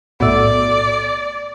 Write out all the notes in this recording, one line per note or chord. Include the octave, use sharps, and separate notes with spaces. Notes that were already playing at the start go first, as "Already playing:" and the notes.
B1 A2 D5